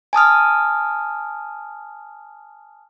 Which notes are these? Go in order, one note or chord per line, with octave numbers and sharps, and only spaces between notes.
G#5 A5 D#6 F6